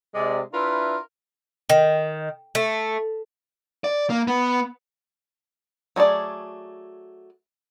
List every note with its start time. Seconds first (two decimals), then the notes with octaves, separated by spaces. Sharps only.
0.15 C3 G#3 D5
0.52 D4 E4 F4 A#4 B4 E5
1.70 D#3
2.55 A3
3.84 D5
4.10 A#3
4.27 B3
5.96 F#3 A3 G#4 D5